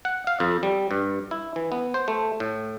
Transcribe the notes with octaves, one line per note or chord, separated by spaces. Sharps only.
F#5
F5
F2
G3
G2
E4
E3
B3
C5
A3
A2